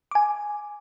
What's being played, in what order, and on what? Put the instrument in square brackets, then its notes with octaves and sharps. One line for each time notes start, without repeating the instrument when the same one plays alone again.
[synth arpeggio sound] G#5 D6